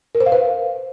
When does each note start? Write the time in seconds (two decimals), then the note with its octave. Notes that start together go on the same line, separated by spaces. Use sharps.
0.15 A#4
0.20 C5
0.26 F5
0.32 B4